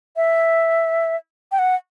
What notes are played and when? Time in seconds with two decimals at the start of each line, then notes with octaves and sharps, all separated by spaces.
0.16 E5
1.52 G5
1.59 F#5